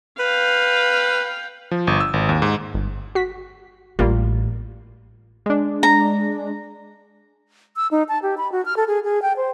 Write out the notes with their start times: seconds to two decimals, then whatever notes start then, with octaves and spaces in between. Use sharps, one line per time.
0.19 B4 F5 G5
1.71 F3
1.87 G1
2.01 E6
2.14 G#1
2.29 D#2
2.42 G#2
2.74 G1
3.15 F#4 B6
3.99 A1 G3 A#3 F4
5.46 G#3 D4
5.83 A#5
7.76 E6
7.91 D#4
8.09 A5
8.22 G4
8.38 B5
8.52 F#4
8.66 F6
8.77 A4
8.88 G#4
9.04 G#4
9.22 G5
9.37 C5